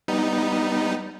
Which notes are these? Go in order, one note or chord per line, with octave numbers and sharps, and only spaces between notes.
G3 B3 D#4